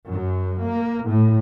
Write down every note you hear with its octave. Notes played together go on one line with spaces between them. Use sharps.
F#2
A#3
A2